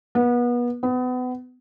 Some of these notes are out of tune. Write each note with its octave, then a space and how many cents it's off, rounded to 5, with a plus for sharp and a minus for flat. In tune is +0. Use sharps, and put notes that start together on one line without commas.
B3 -30
B3 +30